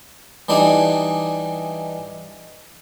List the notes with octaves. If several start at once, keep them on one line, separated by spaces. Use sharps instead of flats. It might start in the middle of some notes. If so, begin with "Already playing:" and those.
E3 G3 D4 D#4 G#4